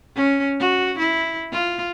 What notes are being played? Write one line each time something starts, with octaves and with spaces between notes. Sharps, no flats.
C#4
F#4
E4
F4